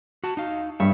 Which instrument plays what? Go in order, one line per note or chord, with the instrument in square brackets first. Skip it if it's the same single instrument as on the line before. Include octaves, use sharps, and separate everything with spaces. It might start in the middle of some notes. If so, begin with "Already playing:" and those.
[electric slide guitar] F#4 A5
D#4 F5
[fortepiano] G2 [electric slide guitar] C#5 E5